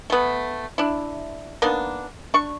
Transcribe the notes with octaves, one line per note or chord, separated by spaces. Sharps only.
A3 B3
D4 E4
A#3 B3 D4 D#4
D4 C#6